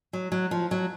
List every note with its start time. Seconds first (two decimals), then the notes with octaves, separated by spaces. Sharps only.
0.13 F#3
0.32 F#3
0.51 F3
0.71 F#3